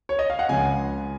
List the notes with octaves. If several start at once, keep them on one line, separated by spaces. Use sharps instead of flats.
C#5
D#5
F5
F#5
C#2 C#3 F3 G#5